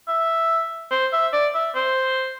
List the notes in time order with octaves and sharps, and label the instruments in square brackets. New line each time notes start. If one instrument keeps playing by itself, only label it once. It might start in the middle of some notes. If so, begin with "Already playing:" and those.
[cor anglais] E5
C5
E5
D5
E5
C5